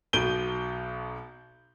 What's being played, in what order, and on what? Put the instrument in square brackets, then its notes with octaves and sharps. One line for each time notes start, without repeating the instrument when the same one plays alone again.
[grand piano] B1 B2 G6 D7 D#7 G7